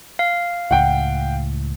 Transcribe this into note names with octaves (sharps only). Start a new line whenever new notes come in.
F5
C#2 A2 F#5 G5